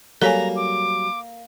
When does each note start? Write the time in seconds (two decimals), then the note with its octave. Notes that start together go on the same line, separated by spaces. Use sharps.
0.22 F#3 G3 A#3 A4 C#5 G#5 A#5
0.56 D6